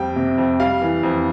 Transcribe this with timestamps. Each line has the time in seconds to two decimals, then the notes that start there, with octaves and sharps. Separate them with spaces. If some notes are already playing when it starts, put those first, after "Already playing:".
Already playing: F2 G3 G5
0.16 C3
0.38 F2
0.60 G3 F5
0.82 E3
1.03 F2